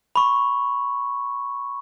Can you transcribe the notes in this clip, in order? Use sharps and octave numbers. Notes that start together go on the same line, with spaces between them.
B5 C#6